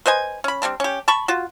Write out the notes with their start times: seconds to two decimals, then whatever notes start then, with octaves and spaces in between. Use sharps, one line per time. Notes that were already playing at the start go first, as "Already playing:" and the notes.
0.06 B4 C5 D#5 G#5
0.44 C#4 B5
0.62 G3 G#3 C4 D4
0.80 C#4 G4
1.08 A5 B5 C#6
1.28 F4 F#4